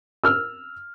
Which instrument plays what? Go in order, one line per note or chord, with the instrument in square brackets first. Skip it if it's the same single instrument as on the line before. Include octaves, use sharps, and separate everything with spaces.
[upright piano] E6 F6